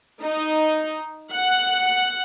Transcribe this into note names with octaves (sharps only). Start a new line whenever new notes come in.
D#4
F#5